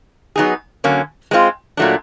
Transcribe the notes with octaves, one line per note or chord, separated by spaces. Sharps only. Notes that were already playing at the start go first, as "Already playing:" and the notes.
F#3 B3 D#4 G#4
D3 F#3 A#3 C#4
G#3 C4 F4
A#2 F#3 A3 D4